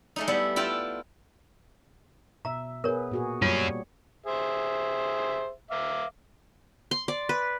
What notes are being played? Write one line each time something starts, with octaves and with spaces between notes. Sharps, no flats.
G#3 A3 D#4
G3 B3 E4
E4 F4 G5 A5
B2 E5 A#5
B3 G#4 A#4 B4 C#5
A#2 F#4 G#4
G3 A#3 C#4 F4 F#4 C#5
G#4 C5 E5
E5 F5 D6
C6
D5
B4